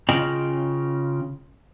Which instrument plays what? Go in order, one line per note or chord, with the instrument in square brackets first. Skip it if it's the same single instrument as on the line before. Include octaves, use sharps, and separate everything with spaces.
[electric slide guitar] C#3 F4 D#5 G5